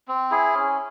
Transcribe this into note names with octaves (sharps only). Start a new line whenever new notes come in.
C4
E4 G#4
C#4